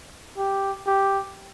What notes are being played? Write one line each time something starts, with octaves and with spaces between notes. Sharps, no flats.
G4
G4